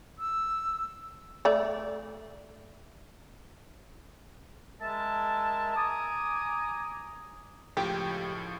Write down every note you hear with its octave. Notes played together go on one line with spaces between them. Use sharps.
E6
A3 D5
G#3 A#4 E5 A5
G#5 A#5 D6 D#6
C#2 A2 F3 G4